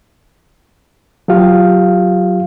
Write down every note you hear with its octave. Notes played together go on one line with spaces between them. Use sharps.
F#3 F4 G4 F5